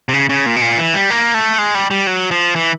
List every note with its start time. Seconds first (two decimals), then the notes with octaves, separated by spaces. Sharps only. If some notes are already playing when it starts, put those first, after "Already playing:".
0.09 C3
0.14 C#3
0.29 C#3
0.46 A#2
0.56 B2
0.62 A#2
0.78 E3
0.94 G3
1.10 A#3
1.34 A3
1.58 G#3
1.75 G3
1.91 G3
2.07 F#3
2.31 F3
2.56 E3